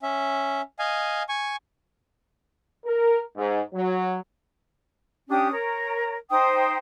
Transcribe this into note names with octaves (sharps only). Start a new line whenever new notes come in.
C#4 E5
D#5 F5 G#5
G#5 C#6
A#4
G#2
F#3
C#4 D4 G4 D#6
A#4 C#5
D#4 C5 G5 D#6